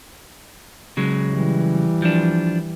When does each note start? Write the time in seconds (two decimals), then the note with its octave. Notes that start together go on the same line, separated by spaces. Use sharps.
0.97 C#3 F#3 G#3
1.32 E3 G3
2.02 F3 D4